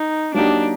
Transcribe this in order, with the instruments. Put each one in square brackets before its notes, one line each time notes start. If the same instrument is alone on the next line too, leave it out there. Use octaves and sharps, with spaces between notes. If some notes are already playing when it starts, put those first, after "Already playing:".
Already playing: [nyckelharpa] D#4
[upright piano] F#3 A#3 D#4 G4 [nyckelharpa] D4